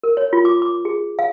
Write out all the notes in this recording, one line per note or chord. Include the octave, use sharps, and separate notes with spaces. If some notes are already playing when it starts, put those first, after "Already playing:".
A#4
C#5
F4
D6
D6
G#4
F5